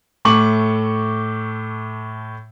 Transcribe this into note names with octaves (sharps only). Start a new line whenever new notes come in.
A2 A3 C#6 D6 F#7